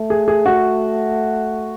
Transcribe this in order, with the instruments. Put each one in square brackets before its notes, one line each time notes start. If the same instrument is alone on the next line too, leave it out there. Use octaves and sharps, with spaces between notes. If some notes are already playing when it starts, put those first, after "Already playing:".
Already playing: [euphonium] A3
[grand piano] G#4
G#4
F#4